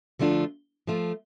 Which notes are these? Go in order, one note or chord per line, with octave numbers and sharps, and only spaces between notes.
D3 F3 A3 D4 F4
F3 A3 F4